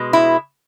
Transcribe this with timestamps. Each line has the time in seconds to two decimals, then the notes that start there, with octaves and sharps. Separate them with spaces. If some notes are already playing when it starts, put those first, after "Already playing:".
Already playing: B2 G#3
0.13 E4